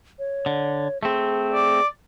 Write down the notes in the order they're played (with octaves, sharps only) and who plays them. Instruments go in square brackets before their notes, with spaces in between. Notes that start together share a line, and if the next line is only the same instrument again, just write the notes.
[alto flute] C#5
[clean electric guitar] D3
[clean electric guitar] A3 C4 [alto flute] G#4
[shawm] D5